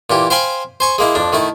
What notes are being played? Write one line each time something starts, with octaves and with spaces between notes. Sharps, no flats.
A#2 E3 G4
C5 F5 G5 G#5 B5 C6
C5 G#5 C#6
G#3 A#3 E4
F2 D4
D#3 A3 E4